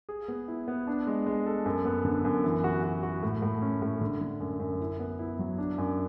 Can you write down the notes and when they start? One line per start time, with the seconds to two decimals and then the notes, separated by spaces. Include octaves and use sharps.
0.09 G#4
0.28 B3
0.48 E4
0.68 B3
0.87 D4
1.07 G#3
1.26 G#3
1.46 A4
1.66 F#2
1.85 B3
2.05 D3
2.25 F#2
2.44 E3
2.64 F#4
2.84 F#4
3.03 F#4
3.23 A2
3.42 A2
3.62 C#4
3.82 A2
4.01 D3
4.21 D3
4.41 F#2
4.60 F#2
4.80 E4
5.00 B3
5.19 E4
5.39 F#3
5.58 D4
5.78 F#2